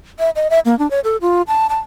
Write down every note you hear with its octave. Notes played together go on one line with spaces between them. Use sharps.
E5
D#5
E5
A#3
D4
C#5
A4
F4
A5
A5